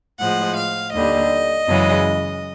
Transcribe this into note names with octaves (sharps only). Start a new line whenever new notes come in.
A2 F3 G#3 F#5
F5
D#2 D3 G3 D#5
F#2 C#3 E3 G#3